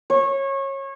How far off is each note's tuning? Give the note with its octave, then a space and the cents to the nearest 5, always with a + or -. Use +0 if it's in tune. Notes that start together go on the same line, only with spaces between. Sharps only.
C#5 -25